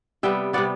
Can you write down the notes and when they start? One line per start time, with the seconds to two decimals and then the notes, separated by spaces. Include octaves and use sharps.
0.23 C3 G3 B3 E5 G5
0.53 C3 G3 B3 D5 F#5